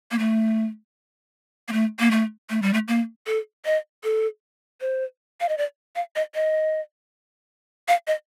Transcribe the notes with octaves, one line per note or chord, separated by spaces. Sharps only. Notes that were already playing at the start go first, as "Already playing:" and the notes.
A#3
A3
A#3
A3
A#3
A3
A3
G3
A3
A#3
A4
D#5
A4
C5
F5
D#5
D5
F5
D#5
D#5
F5
D#5